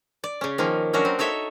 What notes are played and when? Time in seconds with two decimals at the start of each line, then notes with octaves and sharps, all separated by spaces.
0.24 D5
0.41 C#3 C#4
0.58 D#3 F3 A#3 C#4
0.93 F#3 C#4 D4 F#4 A#4
1.05 C4
1.19 D#4 A4 C#5 E5